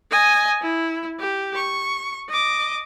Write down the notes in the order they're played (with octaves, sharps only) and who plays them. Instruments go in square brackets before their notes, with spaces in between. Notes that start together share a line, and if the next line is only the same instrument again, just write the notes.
[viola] D#5 G#5
E4
G4
C#6
D#5 D6